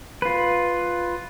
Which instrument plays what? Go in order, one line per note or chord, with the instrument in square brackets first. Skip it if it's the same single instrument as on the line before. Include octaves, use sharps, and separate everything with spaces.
[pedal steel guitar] F4 B4